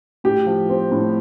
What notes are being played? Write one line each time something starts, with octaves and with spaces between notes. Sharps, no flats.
A2 G4
F3
C4
A2